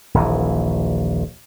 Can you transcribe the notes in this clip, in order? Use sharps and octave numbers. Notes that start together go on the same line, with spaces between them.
D#1 A#1 E3